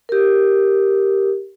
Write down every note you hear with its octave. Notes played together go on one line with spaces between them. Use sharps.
G4 A#4